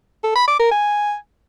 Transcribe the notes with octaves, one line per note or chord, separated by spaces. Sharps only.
A4
B5
D6
A#4
G#5